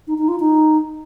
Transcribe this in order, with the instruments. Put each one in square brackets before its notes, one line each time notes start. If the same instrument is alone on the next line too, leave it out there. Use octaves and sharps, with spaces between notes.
[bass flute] D#4
D#4
F4
D#4